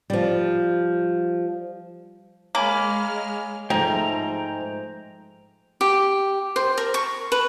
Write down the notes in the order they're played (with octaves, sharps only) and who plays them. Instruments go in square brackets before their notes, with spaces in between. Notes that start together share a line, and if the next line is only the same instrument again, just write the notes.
[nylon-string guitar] F3 G3
[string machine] G#3 F6 [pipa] A#3 [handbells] C#5 G#5 B5
[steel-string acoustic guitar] G#2 [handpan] F3 G#3 A3 [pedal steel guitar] G5 A#5
[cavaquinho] G4
C5
A#4
C#6
B4